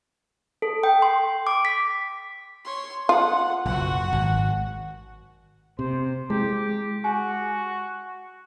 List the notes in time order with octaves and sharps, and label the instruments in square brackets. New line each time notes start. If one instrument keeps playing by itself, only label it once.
[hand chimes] A4
G5
C6
D6
B6
[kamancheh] C#5 C6
[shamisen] F4 [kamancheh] F#5
[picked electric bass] F#1 B1 [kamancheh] F#4 F#5
[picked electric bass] G#1
[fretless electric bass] C3 [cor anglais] C5
[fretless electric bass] G#3 [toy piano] E4 [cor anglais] G4
[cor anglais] F#4 [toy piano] G#5